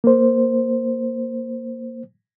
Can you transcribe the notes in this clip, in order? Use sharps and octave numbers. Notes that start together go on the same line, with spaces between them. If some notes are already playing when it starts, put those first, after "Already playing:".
A#3 C5